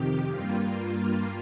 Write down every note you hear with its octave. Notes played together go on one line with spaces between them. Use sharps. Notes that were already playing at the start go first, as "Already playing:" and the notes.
Already playing: F2 C3 D#3 G4
G2 G3 A#3 F4